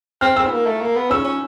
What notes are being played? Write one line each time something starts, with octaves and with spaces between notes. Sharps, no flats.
C4 F6
C4 E6
B3
A#3
A3
A#3
B3
C#4 E6
C#4